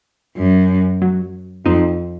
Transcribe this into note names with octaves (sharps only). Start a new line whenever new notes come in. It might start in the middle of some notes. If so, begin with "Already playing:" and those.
F#2
F#3
F2 C4 D#4